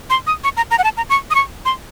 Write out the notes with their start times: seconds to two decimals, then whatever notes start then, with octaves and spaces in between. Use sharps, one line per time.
0.10 C6
0.27 D#6
0.44 C#6
0.57 A#5
0.71 A#5
0.79 F#5
0.84 A5
0.97 A#5
1.10 C#6
1.31 D#6
1.35 C#6
1.65 C6